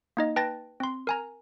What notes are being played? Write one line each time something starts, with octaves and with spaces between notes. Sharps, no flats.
A#3 D#4 D#5
B4 G5 A5 A6 A#6
C4 C6
A#4 G#5 A#5